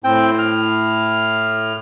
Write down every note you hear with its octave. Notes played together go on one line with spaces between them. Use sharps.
A2 C4 G5
F6